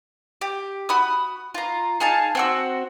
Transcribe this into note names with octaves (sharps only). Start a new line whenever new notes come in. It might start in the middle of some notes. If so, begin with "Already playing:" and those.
G4
F#4 B5 D#6
F4 A#5
D#4 G#4 F5 A5
C4 F#4 E6